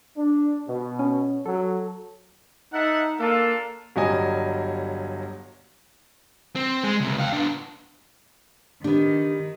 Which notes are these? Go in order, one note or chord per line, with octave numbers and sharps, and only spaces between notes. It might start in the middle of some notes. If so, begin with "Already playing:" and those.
D4
B2
C#4
F#3 A4
D#4 A4 E5 F#5
A#3 D4 F4 A4
G1 F#3 G3 D#5 G#5
C4
G#3
C#2 C3
F5 G5
B3 D4
D#3 B3 D4 G4